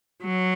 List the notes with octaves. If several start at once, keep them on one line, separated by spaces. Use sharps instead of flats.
F#3